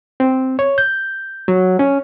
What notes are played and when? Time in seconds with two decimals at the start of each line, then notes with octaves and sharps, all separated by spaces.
0.20 C4
0.59 C#5
0.78 G6
1.48 F#3
1.79 C#4